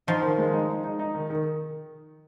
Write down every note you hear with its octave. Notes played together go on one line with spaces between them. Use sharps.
F3 D#4
D#3
G#3
D#4
D#4
D#4
D#4
D#3
D#3